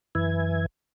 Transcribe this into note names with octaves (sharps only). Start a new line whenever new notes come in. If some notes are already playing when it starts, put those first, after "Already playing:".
F#2 E3 B4 E5 G#5 G#6